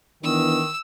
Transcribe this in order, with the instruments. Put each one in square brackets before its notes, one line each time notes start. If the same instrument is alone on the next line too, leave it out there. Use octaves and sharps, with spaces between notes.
[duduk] D#3 [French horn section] E3 B3 D4 [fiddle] E6